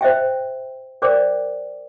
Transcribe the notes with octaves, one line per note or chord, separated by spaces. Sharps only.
C5 D#5 E5 G5
A#4 C5 D5 G5 D6